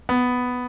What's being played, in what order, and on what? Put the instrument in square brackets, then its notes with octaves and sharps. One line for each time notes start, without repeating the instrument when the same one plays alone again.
[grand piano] B3